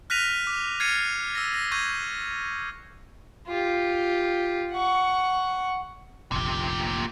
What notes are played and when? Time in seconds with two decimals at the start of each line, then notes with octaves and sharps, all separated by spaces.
0.10 F6 F#6 A#6 B6 D#7 F7
0.47 D6
0.80 F6 G#6 A6 C7 C#7 D#7
1.35 E6 A#6
1.54 A#6
1.72 C#6 G6 G#6 A#6 D#7
3.47 F4 G4
4.72 F#5 C#6
6.32 F1 A#1 A#2 G4